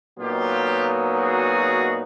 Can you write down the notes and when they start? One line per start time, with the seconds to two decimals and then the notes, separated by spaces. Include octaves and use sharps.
0.18 A#2 F#3 B3 D#4 F4 G4
1.18 F#4 G#4